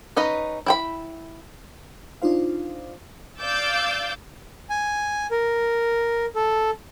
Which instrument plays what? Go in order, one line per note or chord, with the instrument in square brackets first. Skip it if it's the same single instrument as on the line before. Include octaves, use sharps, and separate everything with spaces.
[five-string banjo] C#4 D#4 B4 D#5
E4 G5 B5
[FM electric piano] D4 D#4 F4 C5 F5
[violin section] D5 F5 D6 E6 G6 A6
[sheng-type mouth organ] G#5
A#4
A4